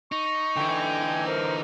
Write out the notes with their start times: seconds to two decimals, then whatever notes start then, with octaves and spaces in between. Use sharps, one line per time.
0.12 D#4 C#6
0.56 D3 E3 G5 G#5
1.27 A#4 C5